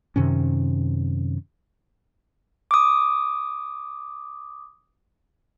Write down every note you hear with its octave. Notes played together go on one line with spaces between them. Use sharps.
F#2 C3 D#3 C#4
D6 D#6